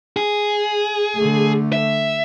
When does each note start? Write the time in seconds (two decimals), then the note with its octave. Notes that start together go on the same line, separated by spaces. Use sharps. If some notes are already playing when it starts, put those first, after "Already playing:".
0.17 G#4
1.16 D3 A3
1.73 E5